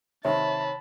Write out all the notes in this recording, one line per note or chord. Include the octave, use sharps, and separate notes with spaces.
C3 D#3 C#5 E5 A5 B5